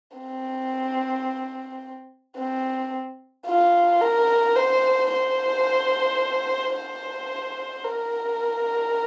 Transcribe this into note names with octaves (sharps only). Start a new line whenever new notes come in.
C4
C4
F4
A#4
C5
C5
C5
A#4